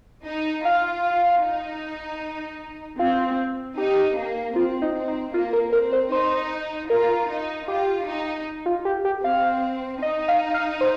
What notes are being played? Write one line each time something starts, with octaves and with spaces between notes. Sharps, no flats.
D#4
F4 F5
D#4
C4 F4
D#4 G4
A#3
C4 F4
D#4
C4
D#4
A#3 F4
A#4
C4 A#4
C5
D#4 C5
F4 A#4
D#4
F4 G4
D#4
F4
G4
G4
C4 F5
D#4 D#5
F5
F5
C5